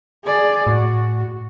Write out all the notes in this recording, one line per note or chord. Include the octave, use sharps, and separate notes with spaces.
G#4 D5
A2 F#4